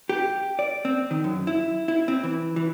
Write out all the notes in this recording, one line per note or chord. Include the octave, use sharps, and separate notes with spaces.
G4
D5
C4
D#3
F#2
E4
E4
C4
E3
E3